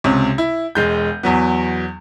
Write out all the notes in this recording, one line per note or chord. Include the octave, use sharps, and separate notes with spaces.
C#2 C3 C#5
E4
E1 G#3 G6
E2 F#3 B3